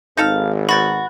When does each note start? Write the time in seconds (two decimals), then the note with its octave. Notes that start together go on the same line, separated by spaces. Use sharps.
0.17 G#1 D#4 A4 F5
0.69 B2 F#4 B5 A6